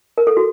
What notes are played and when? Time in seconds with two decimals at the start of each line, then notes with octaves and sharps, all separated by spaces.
0.18 A#4
0.27 A4
0.37 F#4